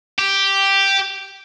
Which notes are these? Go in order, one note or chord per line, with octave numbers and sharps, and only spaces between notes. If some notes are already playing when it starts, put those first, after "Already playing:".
G4